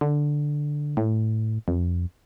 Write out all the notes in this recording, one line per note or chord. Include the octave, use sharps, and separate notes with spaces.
D3
A2
F2